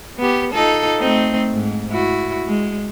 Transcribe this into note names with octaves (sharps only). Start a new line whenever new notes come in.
B3 G4
D#4 F4 A4
A3 C4 D#4
G#2
E4 F#4
G#3